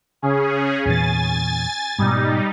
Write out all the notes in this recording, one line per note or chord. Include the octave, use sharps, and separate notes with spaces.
C#3 C#4 G#4
E2 A#2 E3 G#5 A6
G#2 B2 G3 D#4